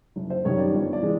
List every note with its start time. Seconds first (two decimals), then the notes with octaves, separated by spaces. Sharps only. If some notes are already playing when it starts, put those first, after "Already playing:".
0.16 F#1
0.30 C5
0.45 F#2 D#3 G3 C#5
0.59 D5
0.73 G1
0.93 D5
1.03 E3 G#3